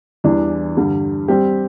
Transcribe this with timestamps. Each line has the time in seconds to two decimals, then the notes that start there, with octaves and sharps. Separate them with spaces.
0.24 E2 E3 G3 D4
0.77 G2 D3 G3
1.28 G3 C4 G4